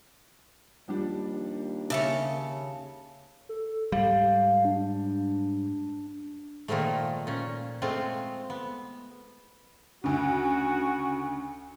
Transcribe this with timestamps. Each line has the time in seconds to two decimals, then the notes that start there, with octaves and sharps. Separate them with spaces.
0.88 D#2 F3 G3 D4
1.90 C#3 C#5 E5 A5
3.49 A4
3.92 G#2 G3 F5
4.65 D4
6.68 A#2 D#3 F3 G#3 A3
7.27 A#2 C#4
7.82 G#3 A3 C4 F4
8.50 B3
10.04 D2 C#3 F#4